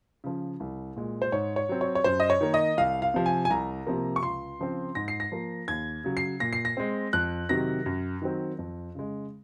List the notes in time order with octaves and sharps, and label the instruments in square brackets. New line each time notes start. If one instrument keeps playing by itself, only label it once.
[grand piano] C#3 F3
C2
A#2 G#3
C5
G#2 C#5
C#5
F#3 C4
C#5
C#5
F#2 C5
D#5
C#5
D#3 A#3
D#5
C2 F5
F5
C3 F3
G#5
G#5
C2 A#5
C3 F3 A#3
C#6
C#2 C6
C#3 F3 C4
G#2 A#6
C7
A#6
F3 A#3
D#2 G#6
C#3 F#3
C7
A#2 A#6
C7
A#6
G#3 C4
F2 F#6
C3 D#3 F#3 A#6
F#2
D#3 F#3 C4
F2
C#3 G#3